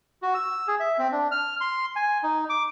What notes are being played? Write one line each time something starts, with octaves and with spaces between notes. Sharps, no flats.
F#4
E6
G#4
E5
C4
D4
F6
C6
G#5
D#4
D6